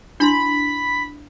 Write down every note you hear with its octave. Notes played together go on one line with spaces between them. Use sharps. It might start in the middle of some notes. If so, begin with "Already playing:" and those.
D4 E4 B5 C6